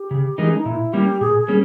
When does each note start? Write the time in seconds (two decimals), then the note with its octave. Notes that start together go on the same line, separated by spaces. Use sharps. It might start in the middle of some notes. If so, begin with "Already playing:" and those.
Already playing: G4
0.11 C#3
0.38 E3 G#3 D#4 A#4
0.45 C#4
0.56 D#4
0.65 A#2 E4
0.93 G3 A#3 C#4 G4
1.20 A#2 G#4
1.39 G#4
1.48 G3 A#3 C#4